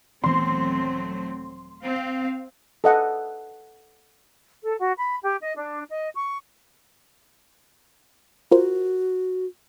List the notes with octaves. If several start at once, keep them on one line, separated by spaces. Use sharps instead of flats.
D#1 E3 F#3 A3 B3 C4 C6
C4 F5
A4 D#5 F#5
A4
F#4
B5
G4
D#5
D4
D#5
C#6
F4 F#4 A#4 C5